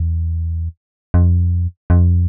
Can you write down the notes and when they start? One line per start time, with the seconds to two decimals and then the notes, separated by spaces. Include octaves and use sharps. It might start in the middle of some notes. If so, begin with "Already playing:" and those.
Already playing: E2
1.14 F2
1.90 F2